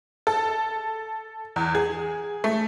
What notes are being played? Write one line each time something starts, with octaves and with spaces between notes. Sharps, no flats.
A4
E2
G#4
A3